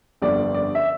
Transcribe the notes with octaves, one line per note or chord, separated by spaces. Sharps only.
G1 F2 D3 G3 D5
D5
E5